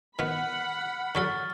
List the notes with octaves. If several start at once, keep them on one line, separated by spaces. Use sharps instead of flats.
D#3 B3 F#5 B5 F6
D3 F#3 A4 C#6 F6 A6